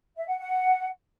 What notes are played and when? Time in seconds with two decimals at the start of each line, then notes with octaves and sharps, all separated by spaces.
0.16 E5
0.27 F#5
0.38 F#5